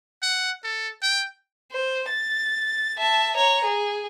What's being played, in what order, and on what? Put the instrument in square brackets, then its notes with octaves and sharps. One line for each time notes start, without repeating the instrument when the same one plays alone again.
[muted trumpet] F#5
A4
G5
[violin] C5
A6
E5 A5
C#5 A#5
G#4